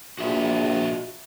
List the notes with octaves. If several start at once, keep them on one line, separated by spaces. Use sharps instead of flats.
A#1 F#4 G#4 E5